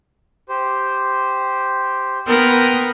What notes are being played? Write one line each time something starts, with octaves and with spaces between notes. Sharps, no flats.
G4 C5
B3 A#4 G5 C6 D#6